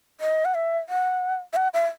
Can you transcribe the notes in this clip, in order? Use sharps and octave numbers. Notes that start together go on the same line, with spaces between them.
D#5
F#5
E5
F#5
E5
F#5
E5